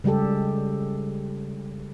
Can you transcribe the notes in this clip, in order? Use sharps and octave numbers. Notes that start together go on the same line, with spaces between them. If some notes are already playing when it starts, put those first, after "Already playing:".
C#3 G3 G#3 G4 A4